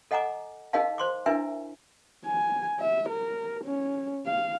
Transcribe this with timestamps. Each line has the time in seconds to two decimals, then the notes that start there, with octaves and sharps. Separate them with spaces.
0.11 A4 D#5 F#5 G#5 A#5 D6
0.73 D#4 G#4 A#4 D#5 F5 A5
0.98 C5 C6 D6
1.26 D4 E4 A#4 B4 E5 G#5
2.26 G#5
2.80 E5
3.09 A#4
3.64 C#4
4.26 F5